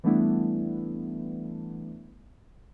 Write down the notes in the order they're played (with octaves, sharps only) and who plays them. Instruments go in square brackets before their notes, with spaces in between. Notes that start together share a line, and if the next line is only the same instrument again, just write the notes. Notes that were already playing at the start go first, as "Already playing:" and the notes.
[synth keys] E3 G3 A3 B3 D4 E4